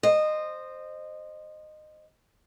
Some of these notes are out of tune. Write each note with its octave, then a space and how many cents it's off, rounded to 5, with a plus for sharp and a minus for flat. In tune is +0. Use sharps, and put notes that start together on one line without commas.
C5 +0 D#5 -20